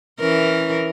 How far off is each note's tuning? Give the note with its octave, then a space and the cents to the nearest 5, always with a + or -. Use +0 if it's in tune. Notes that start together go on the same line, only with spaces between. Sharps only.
E3 +0 C#4 +10 A#4 +0